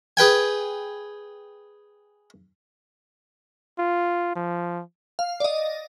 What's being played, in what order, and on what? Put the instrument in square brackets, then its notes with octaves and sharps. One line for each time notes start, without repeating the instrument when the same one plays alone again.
[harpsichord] G#4 B4 G5 G#5
[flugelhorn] F4
F3
[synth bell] F5
D5 D#5